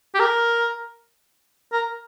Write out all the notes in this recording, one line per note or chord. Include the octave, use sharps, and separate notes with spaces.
G4
A#4
A#4